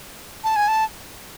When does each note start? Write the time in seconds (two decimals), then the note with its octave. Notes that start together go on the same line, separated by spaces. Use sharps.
0.44 A5
0.56 G#5
0.68 A5